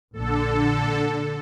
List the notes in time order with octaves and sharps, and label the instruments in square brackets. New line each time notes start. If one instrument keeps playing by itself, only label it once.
[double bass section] A#1 [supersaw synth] D3 A4